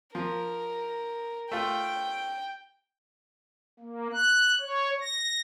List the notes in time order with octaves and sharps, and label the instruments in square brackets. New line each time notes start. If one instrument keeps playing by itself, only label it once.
[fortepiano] F3 [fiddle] A#4
[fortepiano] A3 F4 [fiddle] G5
[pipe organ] A#3
F#6
C#5
A#6